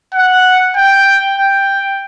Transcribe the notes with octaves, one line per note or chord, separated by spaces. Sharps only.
F#5
G5
G5